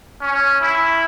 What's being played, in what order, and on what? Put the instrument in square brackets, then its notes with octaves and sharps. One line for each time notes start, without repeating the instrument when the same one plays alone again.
[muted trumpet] C#4
E4